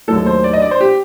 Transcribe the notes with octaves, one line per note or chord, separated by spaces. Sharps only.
D#2 D#3 F#3 A3 A4
C5
D5
D#5
D5
C5
G4